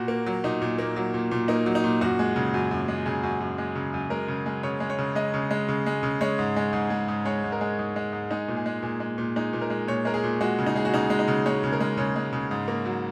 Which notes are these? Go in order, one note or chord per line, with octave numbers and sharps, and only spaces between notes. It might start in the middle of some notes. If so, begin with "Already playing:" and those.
Already playing: A#2 F#4
A#3
F#3
A#2 D#4
A#2
A#3
F#3
A#2
A#2
A#3 D#4
F#3
D#4
A#2
F#2 F#4
G#3
C#3
F#2
F#2
G#3
C#3 G#4
F#2
F#2
G#3
C#3
F#2
G#3 A#4
C#3
G#3
C#3 C#5
G#3
C#5
C#3
G#3 D#5
C#3
G#3
C#3
G#3
C#3
G#3 C#5
G#2
G#3
G#2
G#3
G#2
G#3 C#5
G#2
A#4
G#3
G#2
G#3
G#2
G#3 D#4
A#2
G#4
G#3
A#2 G#4
G#3
A#2
G#3 D#4
A#2
A#4
G#3
A#2 C#5
G#3 A#4
G#4
A#2
G#3 F#4
C#3
D#4
G#3 G#4
F#4
C#3 D#4
G#3
D#4
C#3
G#3 C#5
C#3
A#4
G#3
C#3 C#5
G#3
C#3
G#2
A#3
F#3